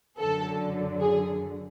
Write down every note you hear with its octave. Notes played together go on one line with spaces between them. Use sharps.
F#2 D3 F#3 A4
G#4